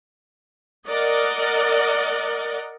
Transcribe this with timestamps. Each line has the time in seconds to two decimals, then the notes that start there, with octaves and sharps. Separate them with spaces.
0.88 A#4 D5 D#5 F#5